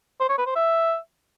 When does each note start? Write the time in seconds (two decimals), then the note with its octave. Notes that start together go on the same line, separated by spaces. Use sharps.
0.21 C5
0.29 C#5
0.38 B4
0.47 C5
0.56 E5